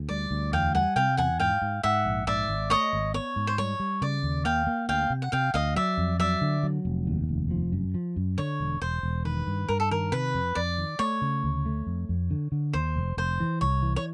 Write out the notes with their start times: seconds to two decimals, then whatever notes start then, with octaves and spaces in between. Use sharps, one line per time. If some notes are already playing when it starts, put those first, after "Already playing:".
Already playing: D2
0.09 G3 D5
0.31 D2
0.53 E2 F5 G5
0.74 G3 F#5 G#5
0.96 C3 F5 G5
1.17 E2 F#5 G#5
1.40 G#2 F5 G5
1.62 G#2
1.83 G#2 E5 F#5
2.05 A#1
2.27 G#2 D5 E5
2.48 G#1
2.70 A3 C#5 D#5
2.93 G#1
3.14 B3 C#5
3.36 G#2
3.47 C5
3.58 G3 C#5
3.80 G3
4.02 C#3 D5
4.23 D#2
4.45 A#3 F5 G5
4.67 A#3
4.89 D2 F5 G5
5.10 C3
5.22 F#5
5.32 C3 F5 G5
5.54 D2 D#5 F5
5.76 F#3 D5 E5
5.98 F2
6.19 F#3 D5 E5
6.41 D3
6.63 F#3
6.85 F1
7.07 D#2
7.29 F1
7.51 F3
7.72 F#2
7.94 F3
8.16 F#2
8.38 D3 C#5
8.60 E1
8.82 E1 C5
9.03 E1
9.25 D#3 B4
9.47 G2
9.68 G2 A#4
9.80 A4
9.91 D#3 A#4
10.12 C3 B4
10.34 F2
10.55 F2 D5
10.78 D#3
10.99 A3 C#5
11.22 C#3
11.44 D2
11.66 A3
11.87 F2
12.09 F2
12.30 D3
12.52 D3
12.73 D#2 C5
12.96 F1
13.17 F1 C5
13.40 E3
13.61 C2 C#5
13.82 E3
13.96 C#5